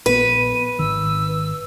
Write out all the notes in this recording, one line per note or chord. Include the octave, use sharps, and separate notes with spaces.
A#1 B3 B4 D#7
G#1 D#3 E6